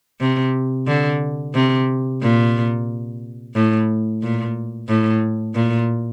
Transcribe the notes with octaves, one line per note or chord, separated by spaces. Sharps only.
C3
D3
C3
A#2
A2
A#2
A2
A#2